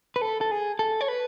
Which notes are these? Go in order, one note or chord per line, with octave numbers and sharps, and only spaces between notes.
B4
A4
A4
G#4
A4
C#5
B4